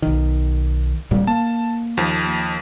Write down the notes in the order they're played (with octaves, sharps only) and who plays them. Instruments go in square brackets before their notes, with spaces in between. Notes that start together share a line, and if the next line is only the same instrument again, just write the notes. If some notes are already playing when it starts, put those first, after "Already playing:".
[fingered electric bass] B1 D#3
D1 A#2 G3
[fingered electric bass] A#3 [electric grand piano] A5
[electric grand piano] D#2 F3